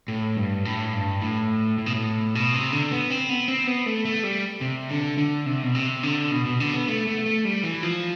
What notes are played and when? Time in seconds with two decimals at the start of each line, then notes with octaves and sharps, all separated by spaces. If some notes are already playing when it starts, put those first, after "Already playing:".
0.08 A2
0.36 G2
0.65 A2
0.93 G2
1.22 A2
1.78 A2
1.86 B2
1.95 A2
2.35 B2
2.54 C3
2.72 D3
2.92 B3
3.10 C4
3.29 B3
3.48 C4
3.67 B3
3.86 A3
4.05 A3
4.23 G3
4.61 C3
4.90 D3
5.18 D3
5.46 C3
5.63 B2
5.75 C3
6.03 D3
6.31 B2
6.46 B2
6.60 D3
6.74 B3
6.88 A3
7.07 A3
7.26 A3
7.45 G3
7.64 E3
7.83 F3